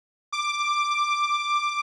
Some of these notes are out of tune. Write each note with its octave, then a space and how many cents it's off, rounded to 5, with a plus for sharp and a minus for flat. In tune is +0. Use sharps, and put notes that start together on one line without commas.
D6 +5